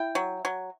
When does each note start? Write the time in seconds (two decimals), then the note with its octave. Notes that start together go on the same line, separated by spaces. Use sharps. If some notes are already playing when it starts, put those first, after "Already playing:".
Already playing: E4 G5
0.15 F#3
0.45 F#3